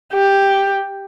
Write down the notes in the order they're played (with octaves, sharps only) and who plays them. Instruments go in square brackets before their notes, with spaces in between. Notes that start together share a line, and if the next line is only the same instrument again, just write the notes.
[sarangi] G4